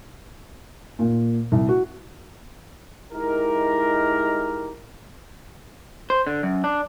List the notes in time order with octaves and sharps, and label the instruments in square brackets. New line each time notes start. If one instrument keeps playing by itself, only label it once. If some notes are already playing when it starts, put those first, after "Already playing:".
[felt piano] A#2
C2
F#4
[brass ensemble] G#3 D#4 E4 G4 A#4
[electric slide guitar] C5
D3
F#2
D4